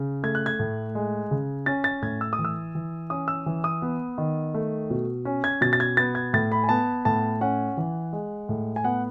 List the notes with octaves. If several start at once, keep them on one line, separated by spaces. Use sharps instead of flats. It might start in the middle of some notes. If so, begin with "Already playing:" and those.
Already playing: C#3
A3 G#6
F#6
G#6
A2
G#3
C#3
C#4 A6
A6
A2 G#6
E6
D#6
E3
E6
E3
C#4 D#6
E6
E3
D#6
B3
D#3
A3
B2
C#4
G#6
B2 A6
A6
G#6
B3 A6
G#6
A2 A6
B5
G#5
B3 A5
A2 A5
C#4 F#5
E3
G#3
A2
G#5
B3 F#5